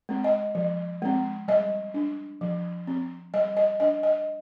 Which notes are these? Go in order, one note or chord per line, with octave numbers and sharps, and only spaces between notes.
G#3 C4
D#5
F3
G#3 C4
G3 D#5
D4
F3
C4
G3 D#5
D#5
D4 D#5
D#5